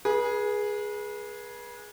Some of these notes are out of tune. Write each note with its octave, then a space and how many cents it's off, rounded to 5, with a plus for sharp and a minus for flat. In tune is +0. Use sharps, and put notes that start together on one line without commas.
G#4 +0 B4 -35